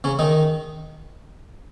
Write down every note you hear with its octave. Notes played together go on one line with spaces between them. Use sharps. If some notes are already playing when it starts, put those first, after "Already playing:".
C#3 C#4
D#3 D#4